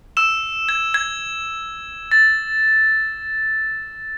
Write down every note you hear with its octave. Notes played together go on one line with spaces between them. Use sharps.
E6 E7
G#6
G#6
A6